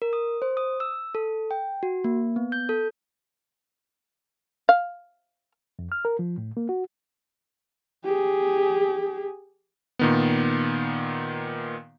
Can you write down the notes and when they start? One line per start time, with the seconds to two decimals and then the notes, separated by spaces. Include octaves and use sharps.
0.02 A#4
0.13 D#6
0.42 C5
0.57 D#6
0.80 E6
1.15 A4
1.51 G5
1.83 F#4
2.04 A#3
2.36 B3
2.52 G6
2.69 A4
4.69 F5
5.79 F2
5.92 F6
6.05 A#4
6.19 F3
6.38 A2
6.57 A#3
6.69 F#4
8.05 G4 G#4
9.99 A#2 D#3 B3